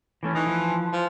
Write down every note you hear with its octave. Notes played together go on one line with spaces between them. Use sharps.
E3 A3 C#4
E3 D#4
F3
F3